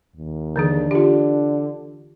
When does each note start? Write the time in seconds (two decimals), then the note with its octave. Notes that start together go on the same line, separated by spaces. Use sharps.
0.16 D#2
0.56 D3 E3 D4 G#4
0.91 D3 F4 G4